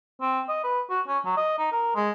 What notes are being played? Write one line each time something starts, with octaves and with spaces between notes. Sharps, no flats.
C4
D#5
B4
F#4
C#4
F#3
D#5
D#4
A#4
G#3